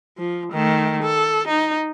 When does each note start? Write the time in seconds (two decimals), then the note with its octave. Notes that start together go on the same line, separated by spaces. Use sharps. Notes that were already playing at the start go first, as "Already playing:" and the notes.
0.18 F3
0.52 D#3 A3
1.03 A4
1.48 D#4